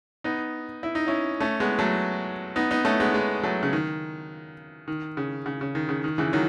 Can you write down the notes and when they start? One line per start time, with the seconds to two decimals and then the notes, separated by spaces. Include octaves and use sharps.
0.24 B3 D#4
0.83 E4
0.95 D#4
1.07 C#4 E4
1.40 A3 C#4
1.60 G#3 B3
1.79 F#3 A3
2.56 B3 D#4
2.71 B3 D#4
2.85 A3 C#4
3.00 G#3 B3
3.14 G#3 B3
3.43 F#3 A3
3.63 C#3
3.73 D#3
4.88 D#3
5.17 C#3
5.46 C#3
5.61 C#3
5.75 D#3
5.89 C#3
6.04 D#3
6.18 C#3 E3
6.33 D#3 F#3